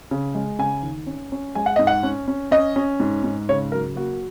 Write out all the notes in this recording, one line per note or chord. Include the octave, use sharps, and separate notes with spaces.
C#3
G#3
C#3 G#5
D#2
C#4
C#4
G#3 G#5
F#5
G#2 D#5
F#5
C#4
C#4
C#4 D#5
C#4
G#2
G#2
C#3 C#5
F#3 A#4
A#3 F#4